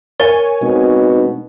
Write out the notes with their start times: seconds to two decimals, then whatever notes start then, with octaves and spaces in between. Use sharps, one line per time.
0.20 A#4 C#5 G#5 A6
0.62 B2 G#3 C4 D#4